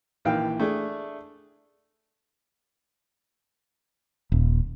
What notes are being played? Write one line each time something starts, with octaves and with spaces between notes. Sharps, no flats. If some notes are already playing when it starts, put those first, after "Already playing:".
A#1 D#3 E3 F5 G5
A3 D4 G#4
D#1